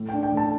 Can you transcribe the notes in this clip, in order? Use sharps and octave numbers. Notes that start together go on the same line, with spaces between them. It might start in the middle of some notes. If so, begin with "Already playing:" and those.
Already playing: A2
D4 G5
G5
A2
A5